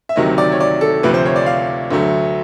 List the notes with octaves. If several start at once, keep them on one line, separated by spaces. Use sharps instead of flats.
E5
D2 C3 D#3 F#3 D#5
D5
C#5
D5
A4
D2 C3 F3 B4
C5
C#5
D5
F5
D2 D3 F#3 A3